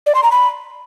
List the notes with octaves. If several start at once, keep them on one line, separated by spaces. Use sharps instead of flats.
D5
C6
A#5
B5